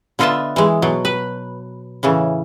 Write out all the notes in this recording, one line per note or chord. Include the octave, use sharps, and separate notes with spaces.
D3 B3 F4 D#5 E5 A5
E3 G#3
B2 F#3
B4
A2 C#3 E3